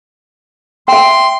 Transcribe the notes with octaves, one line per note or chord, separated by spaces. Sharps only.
E5 G5 C6